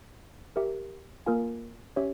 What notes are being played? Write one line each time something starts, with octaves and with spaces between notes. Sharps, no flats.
G4 A#4 E5
A#3 F4 A#4 F5 G#5
C#4 G4 C#5 E5